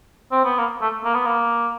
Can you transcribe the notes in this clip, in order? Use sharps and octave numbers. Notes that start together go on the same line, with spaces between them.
C4
B3
A#3
A3
A#3
B3
A#3